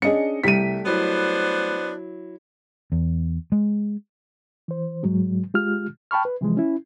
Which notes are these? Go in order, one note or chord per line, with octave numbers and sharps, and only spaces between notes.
C#4 D4 G#4 D#5 C#7
C2 G3 A3 G4 B6 D7 D#7
F#3 B3 D4 E4 C5
E2
G#3
E3 C5
G#2 F#3 G#3
G#3 F4 G4 F6
G5 A5 B5 C#6 F6
B4
C3 E3 F3 G#3
C#4 E4